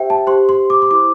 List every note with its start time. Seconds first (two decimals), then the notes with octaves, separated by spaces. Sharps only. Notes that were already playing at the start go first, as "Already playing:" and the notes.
Already playing: G4 C5 E5 G5
0.10 A5
0.27 G4 C5 C6
0.49 C6
0.70 D6
0.82 C6
0.91 E4 C5 D6